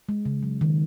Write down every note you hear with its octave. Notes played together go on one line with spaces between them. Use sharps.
G#3
C#3
F#3
D#3